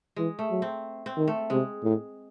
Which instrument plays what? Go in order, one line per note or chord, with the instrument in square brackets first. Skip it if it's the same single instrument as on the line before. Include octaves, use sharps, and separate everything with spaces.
[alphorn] E3 [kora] G#3
[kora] A3
[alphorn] F#3
[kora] C4
C4
[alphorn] D#3
[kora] A3
[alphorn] C3 [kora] G#3
[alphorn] A2